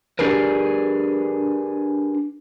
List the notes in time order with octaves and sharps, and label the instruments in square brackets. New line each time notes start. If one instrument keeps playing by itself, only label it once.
[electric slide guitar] D4 G4 G#4 A#4 B4